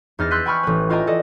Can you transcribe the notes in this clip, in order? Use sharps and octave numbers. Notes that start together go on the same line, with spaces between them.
E2 D#4 F6 A6 A#6
C6 E6 F#6 G6 B6 D#7
G5 G#5 B5 C#6 F6 G6
A1 B4
E4 F4 D#5 G5 G#5 A#5
A4 D5 D#5